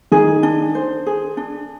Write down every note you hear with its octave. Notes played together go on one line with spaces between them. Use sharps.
D#3 G#4
D4
C5
G#4
D4